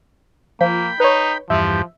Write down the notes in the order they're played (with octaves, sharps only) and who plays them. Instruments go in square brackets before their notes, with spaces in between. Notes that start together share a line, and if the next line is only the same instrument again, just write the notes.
[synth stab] F3 [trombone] A#3 [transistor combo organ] G5 B5
[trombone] D#4 [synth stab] B4 C#5
[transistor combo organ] E2 G2 G4 [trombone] F3 [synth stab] E5